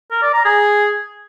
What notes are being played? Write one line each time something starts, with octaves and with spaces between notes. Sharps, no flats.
A#4
D5
A#5
G#4